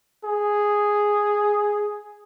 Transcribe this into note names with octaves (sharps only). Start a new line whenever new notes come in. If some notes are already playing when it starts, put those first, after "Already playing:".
G#4